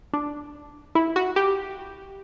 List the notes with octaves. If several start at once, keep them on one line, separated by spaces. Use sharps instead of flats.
D4
E4
F#4
G4